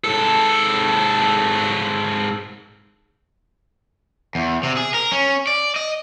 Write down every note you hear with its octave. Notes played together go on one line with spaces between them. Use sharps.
G#2 A4
E2
C3
G#4
A#4
C#4
D5
D#5